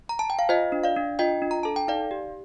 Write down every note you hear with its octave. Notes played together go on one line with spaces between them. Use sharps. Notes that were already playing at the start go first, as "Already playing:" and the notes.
A#5
A5
G5
F5
F4 C5 D#5
D4
D5 F5
D4
F4 D#5 G5
D4
A#5
A4 A5
G5
D#4 D5 F5
G4